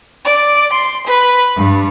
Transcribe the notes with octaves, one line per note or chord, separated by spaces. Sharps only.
D5
C6
B4
G2